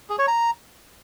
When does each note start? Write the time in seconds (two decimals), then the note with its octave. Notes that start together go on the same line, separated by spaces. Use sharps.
0.10 G#4
0.19 C#5
0.28 A#5